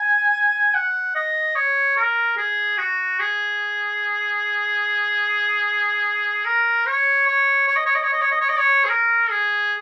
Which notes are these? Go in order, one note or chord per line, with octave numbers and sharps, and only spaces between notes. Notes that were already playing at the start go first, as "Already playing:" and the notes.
Already playing: G#5
F#5
D#5
C#5
A#4
G#4
F#4
G#4
A#4
C#5
C#5
C#5
D#5
C#5
D#5
C#5
D#5
C#5
D#5
C#5
D#5
C#5
G#4
A#4
G#4